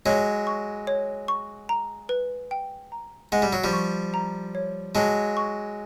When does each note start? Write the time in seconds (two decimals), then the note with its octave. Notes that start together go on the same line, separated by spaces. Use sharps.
0.06 F#3 G#3 C#5
0.47 C#6
0.87 C#5
1.28 C#6
1.69 A#5
2.09 B4
2.51 G5
2.92 A#5
3.32 G#3 F#5
3.42 G3
3.53 F#3
3.64 F3 G3
3.73 C#6
4.14 A#5
4.55 C#5
4.95 F#3 G#3 A5
5.37 C#6